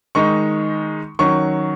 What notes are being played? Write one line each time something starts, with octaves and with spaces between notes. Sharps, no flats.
D#3 G#3 D#4 C#6
D#3 F#3 C#4 C#6